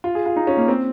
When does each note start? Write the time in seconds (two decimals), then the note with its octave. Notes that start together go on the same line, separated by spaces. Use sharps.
0.04 F4
0.15 G#4
0.26 F4
0.36 D#4
0.47 C#4
0.57 A#3
0.68 C4